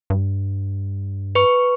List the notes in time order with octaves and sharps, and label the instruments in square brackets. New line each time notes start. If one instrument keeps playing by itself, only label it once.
[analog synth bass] G2
[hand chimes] B4 C#6